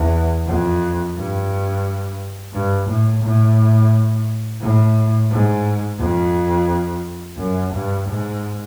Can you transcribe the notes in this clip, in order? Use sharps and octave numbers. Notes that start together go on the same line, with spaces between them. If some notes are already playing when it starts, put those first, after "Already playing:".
Already playing: E2
F2
G2
G2
A2
A2
A2
G#2
F2
F#2
G2
G#2